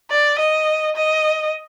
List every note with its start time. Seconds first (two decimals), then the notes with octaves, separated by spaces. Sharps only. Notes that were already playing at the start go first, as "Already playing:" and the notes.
0.11 D5
0.39 D#5
0.96 D#5